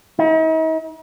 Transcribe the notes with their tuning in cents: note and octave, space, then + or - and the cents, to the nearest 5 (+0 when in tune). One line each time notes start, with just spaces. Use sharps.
D#4 +45